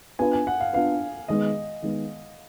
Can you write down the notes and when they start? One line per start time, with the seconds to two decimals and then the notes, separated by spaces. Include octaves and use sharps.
0.19 B3 D4 F4 B4 G#5
0.33 G#5
0.47 F#5
0.60 F5
0.73 B3 D4 F4 B4 F5
1.28 D#3 G#3 B3 D#5
1.82 D#3 G#3 B3